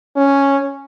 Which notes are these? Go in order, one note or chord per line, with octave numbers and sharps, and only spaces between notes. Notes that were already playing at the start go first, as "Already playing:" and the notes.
C#4